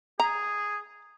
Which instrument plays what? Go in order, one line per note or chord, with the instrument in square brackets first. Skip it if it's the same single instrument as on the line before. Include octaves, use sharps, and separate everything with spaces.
[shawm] G#4 [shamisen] A#5